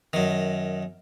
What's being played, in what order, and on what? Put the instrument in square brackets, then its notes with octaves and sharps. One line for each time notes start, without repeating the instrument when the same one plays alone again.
[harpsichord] F#2 D#3